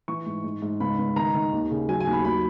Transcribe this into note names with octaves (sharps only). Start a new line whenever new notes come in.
E3 C#6
G#2
G#2
G#2
C#2 B5
C#2
D#3 A#5
D#3
D#2
C#3
F#3 G#5
G#5
D#2
B5
F#3 B5